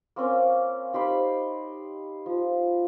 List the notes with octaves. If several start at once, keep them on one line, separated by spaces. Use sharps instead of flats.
A#3 C4 C#4 G#5
D#4 G4 C5 B5
F3